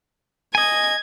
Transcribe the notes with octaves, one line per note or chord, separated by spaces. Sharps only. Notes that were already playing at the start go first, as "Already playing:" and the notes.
D#5 G#5 G#6